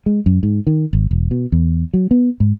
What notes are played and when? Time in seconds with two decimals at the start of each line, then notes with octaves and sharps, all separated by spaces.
0.06 G#3
0.26 F#2
0.43 G#2
0.67 D#3
0.93 G#1
1.11 E1
1.31 B2
1.52 E2
1.94 F#3
2.11 B3
2.40 G#2